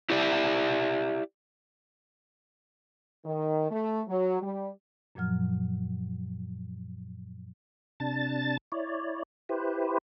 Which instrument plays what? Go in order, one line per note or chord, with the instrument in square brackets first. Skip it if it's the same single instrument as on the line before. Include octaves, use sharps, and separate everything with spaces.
[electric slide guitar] E4 G4 D5 E5
[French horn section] D#3
A3
F#3
G3
[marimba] F#2 A#2 F3 F#3 F6
[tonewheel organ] C3 D4 A5 A6
E4 C#5 D5
E4 G4 B4 C5